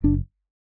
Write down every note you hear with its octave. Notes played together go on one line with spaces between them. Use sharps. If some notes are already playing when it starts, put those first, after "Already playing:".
F#1 D4